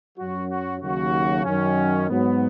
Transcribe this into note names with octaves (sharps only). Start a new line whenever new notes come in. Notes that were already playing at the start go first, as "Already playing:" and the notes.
F#2 F#3 F#4
F#4
D#2 C#3 F#3 F#4
F#2 D#3 F#3 C#4
G#2 F#3 B3